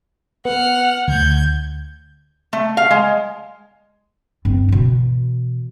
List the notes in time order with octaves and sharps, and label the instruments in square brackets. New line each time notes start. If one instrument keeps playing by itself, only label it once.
[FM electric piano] B3 [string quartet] F#5 F6
[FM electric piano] D2 [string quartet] G6 G#6
[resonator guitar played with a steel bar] A3
F5
G#3
[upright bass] G2 C4
B2 E3